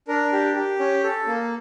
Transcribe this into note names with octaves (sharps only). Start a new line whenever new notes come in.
D4 A#4
G4
G4
C#4
A4
A#3